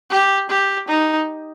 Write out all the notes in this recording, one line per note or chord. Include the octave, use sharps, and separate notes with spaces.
G4
G4
D#4